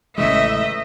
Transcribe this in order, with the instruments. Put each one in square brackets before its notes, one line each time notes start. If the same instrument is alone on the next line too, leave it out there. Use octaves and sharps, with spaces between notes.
[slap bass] A1 C#3 G#3 [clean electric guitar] E3 A3 [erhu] D#5 [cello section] E5